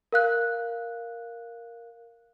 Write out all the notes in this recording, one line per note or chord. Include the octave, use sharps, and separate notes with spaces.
A#4 F5 F#6